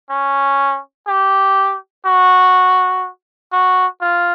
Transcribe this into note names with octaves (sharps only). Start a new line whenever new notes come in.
C#4
G4
F#4
F#4
F4